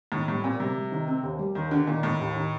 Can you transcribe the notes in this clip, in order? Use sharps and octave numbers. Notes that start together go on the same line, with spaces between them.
A2 D#3
A2 G3
A#2 C4
C3 G3
G3
D#3
C4
D#2
G3
D#2 D#3
D3 D#3
A#2 D#3
A2 D#3
D#2
D#3